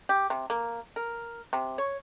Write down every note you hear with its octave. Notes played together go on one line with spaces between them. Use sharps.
G4
C3
A#3
A#4
C3
C#5